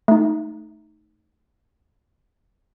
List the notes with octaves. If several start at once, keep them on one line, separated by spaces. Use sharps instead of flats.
A3 D#4